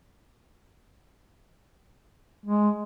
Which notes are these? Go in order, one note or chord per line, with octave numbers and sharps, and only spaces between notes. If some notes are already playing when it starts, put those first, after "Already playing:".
G#3